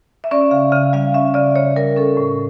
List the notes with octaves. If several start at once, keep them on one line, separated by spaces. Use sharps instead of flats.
E5
C#4 D5
C#3 F5
C#3 F5
G3 F5
C#4 E5
C#3 D5
C#3 C#5
G3 A#4
C#4 A4
A2